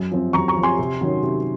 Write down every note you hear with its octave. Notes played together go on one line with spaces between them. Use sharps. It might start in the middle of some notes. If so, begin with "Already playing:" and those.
Already playing: F#2
F3 C4
F#2 A#5 C#6
A#5 C#6
F3
C4 G#5 C6
C3
D#3 F#3 C#4
C3